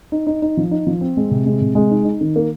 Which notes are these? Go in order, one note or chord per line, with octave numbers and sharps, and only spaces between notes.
D#4
D#4
D#4
F3
D#4
F3
C4
G#3
C3
G#3
C3
G#3
D#4
D#4
D#3
A#3